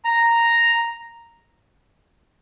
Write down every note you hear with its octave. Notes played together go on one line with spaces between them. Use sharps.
A#5